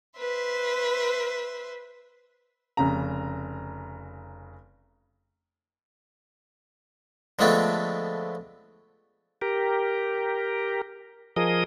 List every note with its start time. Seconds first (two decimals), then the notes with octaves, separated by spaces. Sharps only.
0.18 B4 C5 E5
2.77 F1 C#3 A#5
7.39 D3 F3 G#3 A3 B3 C4
9.42 G4 A#4
11.36 F3 G#4 A#4 D#5 D#6